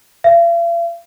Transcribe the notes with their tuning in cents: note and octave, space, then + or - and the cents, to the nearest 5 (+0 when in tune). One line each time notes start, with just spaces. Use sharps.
F5 -45